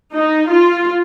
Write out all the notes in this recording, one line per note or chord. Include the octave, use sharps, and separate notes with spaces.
D#4
F4